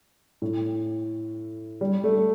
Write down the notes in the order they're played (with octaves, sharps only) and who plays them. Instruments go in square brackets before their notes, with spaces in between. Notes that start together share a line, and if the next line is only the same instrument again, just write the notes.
[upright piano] A2
G3
A3